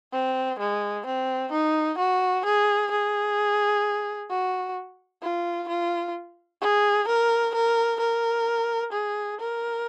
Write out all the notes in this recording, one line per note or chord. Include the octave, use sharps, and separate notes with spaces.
C4
G#3
C4
D#4
F#4
G#4
G#4
F#4
F4
F4
G#4
A#4
A#4
A#4
G#4
A#4